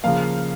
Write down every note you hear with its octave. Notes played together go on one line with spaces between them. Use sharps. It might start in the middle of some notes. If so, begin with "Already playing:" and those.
C#3 F3 A#3 F5